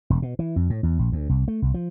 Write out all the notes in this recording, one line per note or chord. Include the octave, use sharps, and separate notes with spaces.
E1
B2
E3
F2
A2
E2
A#1
D2
C2
A3
C2
F3